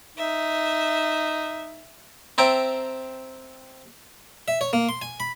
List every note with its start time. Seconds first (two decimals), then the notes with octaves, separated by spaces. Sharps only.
0.17 D#4 E5
2.38 C4 C5 E5 G5 A5 A#5
4.48 E5
4.61 C#5
4.73 A#3
4.89 C6
5.02 G#5
5.20 B5